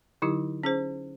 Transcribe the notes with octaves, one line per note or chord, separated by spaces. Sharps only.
D3 F#3 D#4 E4 G4
C#4 G#4 C5